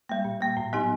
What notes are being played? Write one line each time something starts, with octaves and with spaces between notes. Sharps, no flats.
G3 A#3
A#2
G3 A#3
A2
F#3 B3 D#4 G4